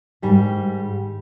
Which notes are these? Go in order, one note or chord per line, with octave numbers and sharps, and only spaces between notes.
G#2 D#3 G3